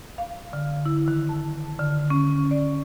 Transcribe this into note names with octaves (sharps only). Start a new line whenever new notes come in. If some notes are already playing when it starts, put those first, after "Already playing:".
F5
D3
E4
D#3
A5
D3
C#4
D5